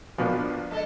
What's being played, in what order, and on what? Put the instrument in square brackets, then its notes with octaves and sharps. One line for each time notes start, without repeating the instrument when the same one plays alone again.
[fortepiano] A#1 B2 F3 [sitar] D4
[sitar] G#3 A4 D#5